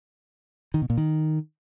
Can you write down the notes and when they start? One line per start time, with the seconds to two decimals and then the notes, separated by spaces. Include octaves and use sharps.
0.74 D#3
0.82 B2
0.90 A#2
0.97 D#3